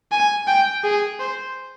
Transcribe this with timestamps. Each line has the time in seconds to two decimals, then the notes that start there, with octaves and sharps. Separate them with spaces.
0.12 G#5
0.47 G5
0.84 G#4
1.20 C5